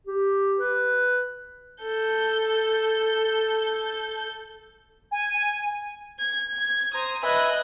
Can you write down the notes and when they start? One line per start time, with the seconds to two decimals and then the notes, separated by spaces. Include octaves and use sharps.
0.07 G4
0.58 B4
1.82 A4 G6
5.11 G#5
6.19 G#6
6.52 G#6
6.94 C5 A#5 D#6
7.23 B4 D#5 E5 G#5 F#6